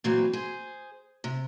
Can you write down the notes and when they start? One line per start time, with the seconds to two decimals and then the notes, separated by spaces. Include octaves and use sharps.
0.04 A#2 E3 F#3 C4
0.33 G#4 C5
1.24 C3